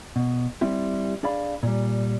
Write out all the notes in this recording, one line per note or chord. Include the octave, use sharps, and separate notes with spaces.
B2
G3 C4 E4 G4
D4 G#4 D5 F5 B5
A#2 G3